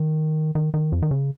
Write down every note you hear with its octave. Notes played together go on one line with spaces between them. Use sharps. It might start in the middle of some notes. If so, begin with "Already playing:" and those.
Already playing: D#3
D#3
D#3
F2
D#3
C#3